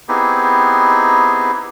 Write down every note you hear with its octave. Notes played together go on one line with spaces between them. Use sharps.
B3 C4 D#4 E4 G4 G#4